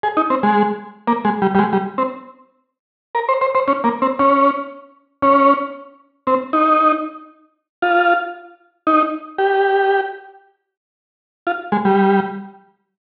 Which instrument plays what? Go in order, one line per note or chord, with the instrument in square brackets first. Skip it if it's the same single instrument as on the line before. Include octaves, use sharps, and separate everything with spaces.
[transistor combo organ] G#4
D#4
C4
G#3
A#3
G#3
G3
G3
G#3
G3
C4
A#4
C5
C5
C5
C#4
A#3
C4
C#4
C#4
C4
D#4
F4
D#4
G4
F4
G#3
G3